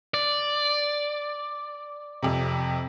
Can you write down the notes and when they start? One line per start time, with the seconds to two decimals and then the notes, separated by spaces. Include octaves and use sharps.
0.14 D5
2.23 F2 C3